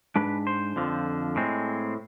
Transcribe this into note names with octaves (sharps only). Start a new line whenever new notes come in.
G#2 G#3 D4 B4
C5
F2 D3 F3
A2 G#3 C4